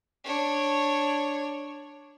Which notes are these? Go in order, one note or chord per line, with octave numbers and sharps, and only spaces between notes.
D4 C#5